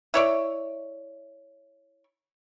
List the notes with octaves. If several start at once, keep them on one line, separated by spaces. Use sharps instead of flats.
E4 C#5 D5